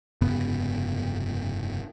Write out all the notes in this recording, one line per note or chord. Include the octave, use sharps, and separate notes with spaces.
F1 G2 C#3 B3